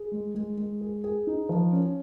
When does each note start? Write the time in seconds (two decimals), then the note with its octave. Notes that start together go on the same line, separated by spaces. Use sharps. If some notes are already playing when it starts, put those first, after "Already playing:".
Already playing: G#4
0.12 G#3
0.35 G#3
0.57 G#3
0.81 G#4
1.04 G#4
1.27 D#4
1.49 F3
1.73 C#4